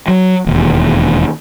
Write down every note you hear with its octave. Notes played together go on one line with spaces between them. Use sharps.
F#3
E1 D#2